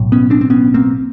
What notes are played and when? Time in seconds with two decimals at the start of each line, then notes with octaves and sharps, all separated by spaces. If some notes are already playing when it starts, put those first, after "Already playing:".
Already playing: B1 A2
0.12 B3 C#4
0.30 C4 D4
0.41 C4
0.50 B3 C#4
0.74 A#3 C4